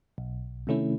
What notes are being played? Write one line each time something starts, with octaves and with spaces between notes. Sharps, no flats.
B1
C3 D#3 A3 C#4 E4